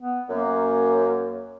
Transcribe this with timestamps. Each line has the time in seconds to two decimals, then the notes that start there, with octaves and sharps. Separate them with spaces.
0.01 B3
0.29 F#2 A#3